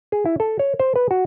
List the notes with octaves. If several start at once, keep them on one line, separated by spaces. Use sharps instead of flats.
G#4
E4
A4
C#5
C5
B4
F#4